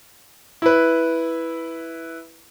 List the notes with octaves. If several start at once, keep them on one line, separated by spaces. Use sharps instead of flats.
E4 B4